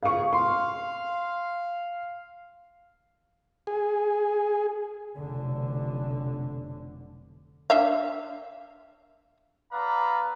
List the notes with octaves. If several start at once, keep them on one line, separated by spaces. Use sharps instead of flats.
C#3 G4 G#4 F5 C#6
F5 C6
G#4
F1 B1 D3
D4 E5 F5
B3 A4 B4 D5 F5 A#5